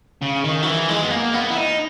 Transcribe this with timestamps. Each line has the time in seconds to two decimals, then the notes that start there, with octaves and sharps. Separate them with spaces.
0.22 C#3
0.44 D#3
0.62 F#3
0.66 E3
0.89 G#3
1.03 B3
1.11 A#3
1.34 B3
1.50 E4
1.57 D#4